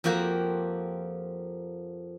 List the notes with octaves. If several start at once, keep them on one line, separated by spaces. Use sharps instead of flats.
F2 F3 A#3 F#4 G4 A#5